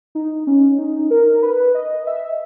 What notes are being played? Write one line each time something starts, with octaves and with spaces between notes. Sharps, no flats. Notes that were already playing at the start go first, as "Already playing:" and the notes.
D#4
C#4
D#4
A#4
B4
D#5
E5